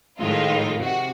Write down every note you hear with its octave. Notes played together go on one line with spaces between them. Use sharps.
A2 D#3 F3 G#3 D#4 F4
C3 F#4